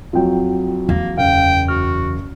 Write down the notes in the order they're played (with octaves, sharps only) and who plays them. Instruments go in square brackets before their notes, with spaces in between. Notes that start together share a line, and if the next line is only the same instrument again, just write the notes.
[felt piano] F2 F#3 [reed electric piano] F4 G5
[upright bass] E2 [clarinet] A#3
[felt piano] F#1 [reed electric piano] F5 [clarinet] G5
[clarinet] F#4 [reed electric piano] F6